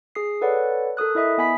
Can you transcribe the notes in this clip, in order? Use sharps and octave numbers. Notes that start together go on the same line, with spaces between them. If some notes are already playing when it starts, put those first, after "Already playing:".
G#4 D#6 C7
A4 B4 C#5 D5 F#5
A4 A#4 D#6 F#6
E4 D#5 E5 D#6
B3 G#5 B5 B6